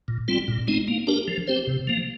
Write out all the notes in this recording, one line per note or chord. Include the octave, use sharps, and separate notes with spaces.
A#2
G3 C4 F4
A#2
G#3 C4 D#4
A#3
D4 G4 A#4
F3
C4 G4 C5
C3
F3 A#3